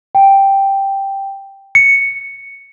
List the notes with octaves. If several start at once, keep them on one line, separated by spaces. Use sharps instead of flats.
G5
C#7